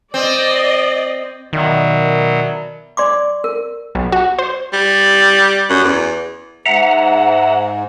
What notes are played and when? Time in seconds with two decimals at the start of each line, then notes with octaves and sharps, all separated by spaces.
0.14 C4 D5 D#5
1.53 B2 D#3 F#3 A#4 D5 E5
2.97 D5 C6 D6
3.44 A#4
3.95 B1
4.12 F#4
4.39 C5
4.73 G3
5.70 F#2
5.84 E2
6.66 G#2 E5 F#5 A#5